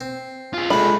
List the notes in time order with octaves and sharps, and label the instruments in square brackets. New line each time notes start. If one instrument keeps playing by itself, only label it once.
[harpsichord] C4
[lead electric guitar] F4 G#4
[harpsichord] G#3 A3 [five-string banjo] B5